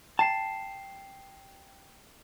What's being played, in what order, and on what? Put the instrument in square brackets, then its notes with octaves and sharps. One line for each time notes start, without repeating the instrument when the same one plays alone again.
[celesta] G5 C7 E7 [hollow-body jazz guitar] A5